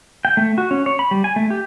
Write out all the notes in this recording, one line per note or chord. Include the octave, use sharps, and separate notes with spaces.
G5
A3
F#4
C#4
C#5
B5
G3
G#5
A3
G4